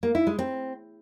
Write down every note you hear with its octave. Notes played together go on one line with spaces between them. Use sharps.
A#3
E4
G#3
C4